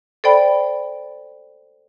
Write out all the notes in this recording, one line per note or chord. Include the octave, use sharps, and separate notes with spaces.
A4 C5 D5 G5 B5